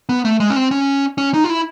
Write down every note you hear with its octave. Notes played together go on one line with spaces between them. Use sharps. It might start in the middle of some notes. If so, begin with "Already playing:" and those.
B3
A3
G#3
C#4
C4
C#4
C#4
D#4
F4
E4